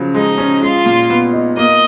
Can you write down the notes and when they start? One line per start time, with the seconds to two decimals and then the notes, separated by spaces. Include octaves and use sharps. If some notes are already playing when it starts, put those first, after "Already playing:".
Already playing: C#3 F3 F#3
0.15 G#3 D#4
0.38 C#4
0.62 G#3 F4
0.86 A#2
1.10 B3
1.33 D#4
1.57 A#3 D#5